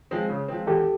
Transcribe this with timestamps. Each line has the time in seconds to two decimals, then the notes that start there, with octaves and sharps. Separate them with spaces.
0.11 F3 G#3 C4
0.30 C#3
0.48 F3 G#3 C4
0.67 E2 G4 A4